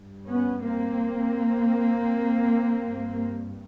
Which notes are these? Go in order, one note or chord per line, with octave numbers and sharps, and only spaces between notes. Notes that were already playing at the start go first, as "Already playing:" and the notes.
Already playing: G2
B3 C#4
A#3 C4
G2